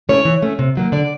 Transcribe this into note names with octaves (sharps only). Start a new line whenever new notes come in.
A3 C#4 E4 C#5
E3
A3 C#4
C3
D#3 F#3 A#3
D3 D5